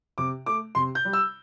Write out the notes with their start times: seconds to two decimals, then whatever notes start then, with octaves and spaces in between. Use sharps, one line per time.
0.18 C3 D6
0.46 A3 D6
0.75 C3 C6
0.95 G6
1.05 G3
1.13 E6